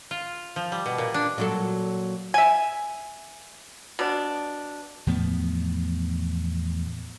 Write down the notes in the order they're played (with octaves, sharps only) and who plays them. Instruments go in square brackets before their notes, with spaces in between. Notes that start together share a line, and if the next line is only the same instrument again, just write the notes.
[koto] F4
F3
G3
B2
A#2
D4
[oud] A#2 F#3 A4
[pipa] E5 G#5
B2 D4
[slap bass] E2 A2 F3 B3